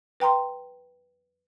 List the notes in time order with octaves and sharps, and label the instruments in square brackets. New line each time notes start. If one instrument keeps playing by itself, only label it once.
[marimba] B4 G5 A#5 C6